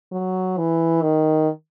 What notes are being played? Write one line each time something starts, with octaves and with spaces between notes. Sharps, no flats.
F#3
E3
D#3